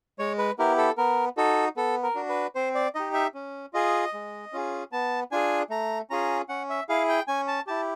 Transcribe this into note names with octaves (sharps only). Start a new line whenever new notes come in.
G#3 C#5
B4
B3 E4 G4 A#4
A4
B3 A#4
D#4 F#4 A4
B3 A4
A#4
D4 F#4
B4
C4 C5
D5
D#4 G4 D#5
E5
C#4
F4 G#4 D#5
G#3
C#4 F4 G#4
B3 A5
D4 F4 G#4 G#5
A3 A#5
C#4 F4 G#4 A#5
C#4 F#5
E5
E4 G#4 F5
G5
C#4 G#5
A5
E4 G4 A5